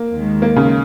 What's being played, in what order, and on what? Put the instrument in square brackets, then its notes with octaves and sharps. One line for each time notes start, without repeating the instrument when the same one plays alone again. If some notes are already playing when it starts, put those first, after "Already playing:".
Already playing: [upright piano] A#3
[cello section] D#2 D#3 G#3
[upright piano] A#3
C#3